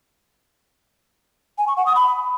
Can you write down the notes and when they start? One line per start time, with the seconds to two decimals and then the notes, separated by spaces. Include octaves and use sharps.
1.58 G#5
1.68 C#6
1.77 F#5
1.86 D#6
1.96 B5